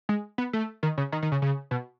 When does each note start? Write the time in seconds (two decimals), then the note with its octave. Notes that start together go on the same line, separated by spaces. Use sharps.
0.09 G#3
0.38 B3
0.53 A3
0.83 D#3
0.98 C#3
1.12 D#3
1.23 D#3
1.32 C#3
1.42 C#3
1.71 B2